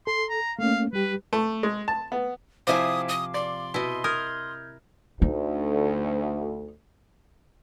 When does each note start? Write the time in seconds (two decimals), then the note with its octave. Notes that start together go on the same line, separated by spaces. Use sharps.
0.07 A4 C6
0.30 A#5
0.59 A3 A#3 C#4 F5
0.93 G3 G4 B4
1.33 A3
1.63 G#3
1.88 A5
2.12 B3
2.67 C3 F3 C4 E4 F5 G#5 D6 D#6
3.09 D#6
3.34 D5 C6
3.74 B2 E4 D#5
4.04 A#4 D#6 F6 G6 G#6
5.22 D2 D#4